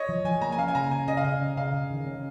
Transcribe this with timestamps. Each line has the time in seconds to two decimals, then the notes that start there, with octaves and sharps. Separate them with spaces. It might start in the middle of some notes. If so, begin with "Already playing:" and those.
Already playing: C#5 D#5
0.09 F3
0.24 F3 G#5
0.41 A#3 A#5
0.52 G#5
0.58 C#4 F5
0.68 G#5
0.75 C#3 A#5
0.91 C#4 G#5
1.08 C#3 D#5
1.17 F5
1.24 C#3 D#5
1.41 C#4
1.57 C#3 F5
1.74 C#3
1.90 D#3
2.07 C#4